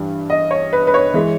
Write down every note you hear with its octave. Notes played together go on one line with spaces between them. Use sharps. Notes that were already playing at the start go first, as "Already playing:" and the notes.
Already playing: G2 E3 G3
D#5
C#5
B4
B4
C#5
E3 G#3